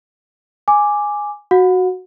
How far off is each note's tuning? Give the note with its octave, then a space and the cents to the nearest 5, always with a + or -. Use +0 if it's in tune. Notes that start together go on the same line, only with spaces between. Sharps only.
G#5 +0 D6 +0
F#4 +0 F#5 -35